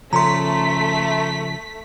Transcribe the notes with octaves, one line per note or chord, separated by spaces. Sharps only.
C#3 F3 A3 C#4 A#5 C6 B6